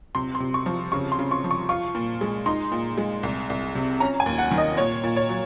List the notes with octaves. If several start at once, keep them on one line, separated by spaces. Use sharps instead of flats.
C3 C6
C6
C3
C#6
F3
C#3 C#6
C6
C#3
C#6
F3
C#6
F4 C#6
A#2
G#3
D#4 C6
A#2
G#3
C2
C2
C3
C#4 A#5
G#5
D#2
F#5
D#3
D#5
A#2 C#5
A#2
C#5
F#3